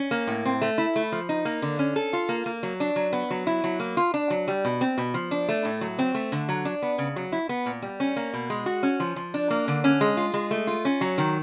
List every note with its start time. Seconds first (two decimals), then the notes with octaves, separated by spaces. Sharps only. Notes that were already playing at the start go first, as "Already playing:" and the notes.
Already playing: C#4
0.11 A#3
0.27 A2
0.45 C4
0.62 A3
0.78 E4
0.96 A3
1.12 F3
1.29 D#4
1.45 A#3
1.62 D3
1.79 C#4
1.96 A4
2.13 F4
2.29 A#3
2.46 A#3
2.63 F#3
2.80 D4
2.96 F#3
3.13 B3
3.31 F#3
3.47 E4
3.64 F#3
3.80 A#3
3.97 F4
4.14 D4
4.30 F#3
4.48 G3
4.65 B2
4.81 C4
4.98 B2
5.14 F3
5.31 D4
5.49 A3
5.65 A2
5.81 F#3
5.99 C4
6.14 A3
6.32 D3
6.49 F#3
6.65 D4
6.82 B3
6.98 C#3
7.16 F#3
7.32 E4
7.49 B3
7.66 A#2
7.82 G3
8.00 C#4
8.16 A#3
8.34 B2
8.50 G#3
8.66 F#4
8.83 C#4
9.00 F3
9.16 F3
9.34 D4
9.50 A#3
9.68 D3
9.84 C#4
10.01 G#3
10.17 F4
10.34 G#3
10.51 A3
10.67 F4
10.85 C#4
11.01 F#3
11.18 D#3